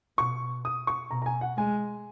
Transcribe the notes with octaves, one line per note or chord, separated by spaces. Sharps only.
B2 C#6
D#6
C#6
B2 A#5
A#5
G#5
F#5
G#3 G#5